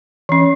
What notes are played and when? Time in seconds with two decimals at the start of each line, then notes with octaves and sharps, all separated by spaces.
0.29 E3 C#4